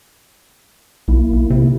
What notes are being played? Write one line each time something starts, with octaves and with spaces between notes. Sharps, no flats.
B1 A#3 E4
B1
C3